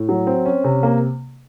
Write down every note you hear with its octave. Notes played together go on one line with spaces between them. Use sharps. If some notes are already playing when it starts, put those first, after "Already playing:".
Already playing: A2
F#3
C4
C#4
C3
A#3